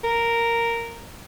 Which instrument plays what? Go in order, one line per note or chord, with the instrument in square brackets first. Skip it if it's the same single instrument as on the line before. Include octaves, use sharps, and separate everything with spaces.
[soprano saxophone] A#4